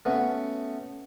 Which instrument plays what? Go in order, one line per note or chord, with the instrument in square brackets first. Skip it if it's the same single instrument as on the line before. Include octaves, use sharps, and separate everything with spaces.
[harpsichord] A3 B3 C#4 F#4